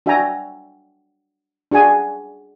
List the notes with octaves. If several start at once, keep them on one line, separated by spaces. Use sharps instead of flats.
D4 F#4 E5 G5 G#5 A#5
D4 F#4 G#4 G#5